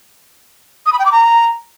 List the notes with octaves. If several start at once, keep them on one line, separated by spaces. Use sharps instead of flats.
D#6
B5
G5
D6
A#5